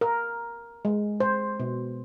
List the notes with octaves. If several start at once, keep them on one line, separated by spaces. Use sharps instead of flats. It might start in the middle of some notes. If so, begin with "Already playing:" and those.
A#4
G#3
C5
B2